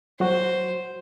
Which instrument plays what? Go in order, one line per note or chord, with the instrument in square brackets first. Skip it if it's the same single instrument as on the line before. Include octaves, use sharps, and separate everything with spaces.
[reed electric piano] F#3 F#4 [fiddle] C5